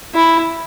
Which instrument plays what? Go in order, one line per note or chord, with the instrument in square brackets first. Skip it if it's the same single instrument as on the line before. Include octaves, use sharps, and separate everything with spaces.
[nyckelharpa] E4